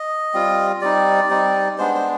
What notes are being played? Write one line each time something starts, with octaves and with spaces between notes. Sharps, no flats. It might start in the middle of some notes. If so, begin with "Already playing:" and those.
Already playing: D#5
G3 C4 F4
G3 C4 D#4 D5
G3 C4 D#4
G#3 B3 D4 C5
C5